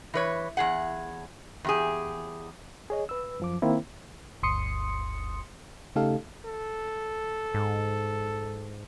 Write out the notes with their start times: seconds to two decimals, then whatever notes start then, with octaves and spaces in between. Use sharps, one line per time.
0.14 E3 B4 C#5
0.57 E2 G#4 F#5
1.64 E2 G4 G#4
2.90 G#4 C#5 D#5
3.09 B4 E6
3.40 F#2 F3 D6
3.62 D#3 A#3 C4 E4
4.43 G1 D2 C6 D#6 C#7
5.96 C#3 A3 D#4 G4 A4 F5
6.45 A4
7.54 G#2